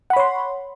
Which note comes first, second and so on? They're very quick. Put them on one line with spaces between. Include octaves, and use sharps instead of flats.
F#5 B5 C#5 C6